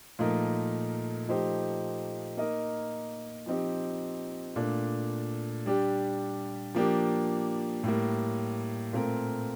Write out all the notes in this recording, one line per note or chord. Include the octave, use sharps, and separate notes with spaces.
A#2 F3 A3 D#4 A#4
F3 A3 D#4 G4 C5
A#3 D#4 A#4 D#5
F3 C4 D#4 G4
A#2 A3 D4
G3 D4 G4
F3 A#3 D4 G4
A2 G3 A#3
A#2 A3 C4 F4 A#4